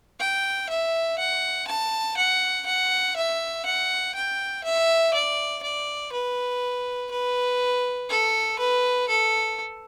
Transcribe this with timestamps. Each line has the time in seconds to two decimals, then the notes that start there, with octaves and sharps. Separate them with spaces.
0.20 G5
0.69 E5
1.18 F#5
1.67 A5
2.17 F#5
2.66 F#5
3.16 E5
3.66 F#5
4.15 G5
4.64 E5
5.14 D5
5.63 D5
6.12 B4
7.11 B4
8.09 A4
8.59 B4
9.09 A4